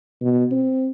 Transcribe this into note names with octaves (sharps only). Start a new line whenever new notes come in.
B2
C4